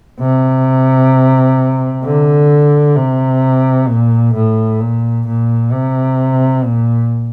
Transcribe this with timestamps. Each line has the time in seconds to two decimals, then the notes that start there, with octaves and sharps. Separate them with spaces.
0.20 C3
2.04 D3
2.96 C3
3.88 A#2
4.34 A2
4.81 A#2
5.27 A#2
5.72 C3
6.65 A#2